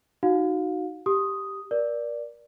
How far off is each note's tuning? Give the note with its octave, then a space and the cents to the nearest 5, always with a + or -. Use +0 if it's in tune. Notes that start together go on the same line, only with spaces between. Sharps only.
D#4 +0 F#4 +0 F5 +30
G4 +0 D#6 +0
A#4 +30 D5 +0